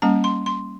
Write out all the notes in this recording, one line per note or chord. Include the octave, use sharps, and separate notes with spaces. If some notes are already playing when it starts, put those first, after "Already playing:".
G3 A#3 C#4 A#5
C6
C6